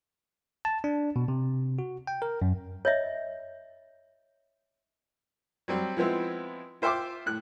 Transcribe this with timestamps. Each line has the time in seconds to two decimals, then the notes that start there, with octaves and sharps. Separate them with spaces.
0.65 A5
0.84 D4
1.16 B2
1.28 C3
1.79 F#4
2.07 G5
2.22 A#4
2.42 F#2
2.85 C#5 D#5 E5
5.68 F#3 G3 C4
5.97 F3 G#3 B3 C4 E4
6.82 F4 C5 E5 G5 C6 D6
7.26 A2 F#6